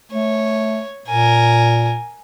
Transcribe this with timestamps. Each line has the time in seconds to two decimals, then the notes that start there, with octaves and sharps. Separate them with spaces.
0.11 A3 C#5
1.07 A#2 A#4 G#5